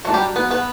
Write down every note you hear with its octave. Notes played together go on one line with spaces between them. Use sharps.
F#3 A3 D4 F#4
G3 G4
B3 B4
B3 B4